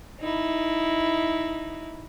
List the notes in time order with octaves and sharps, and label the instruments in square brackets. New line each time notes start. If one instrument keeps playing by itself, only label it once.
[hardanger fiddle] D#4 E4